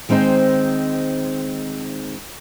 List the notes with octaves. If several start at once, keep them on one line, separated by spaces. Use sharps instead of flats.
D#3 G#3 C4 D#4 C5